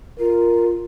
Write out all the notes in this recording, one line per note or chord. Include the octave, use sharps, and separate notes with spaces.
F4 A#4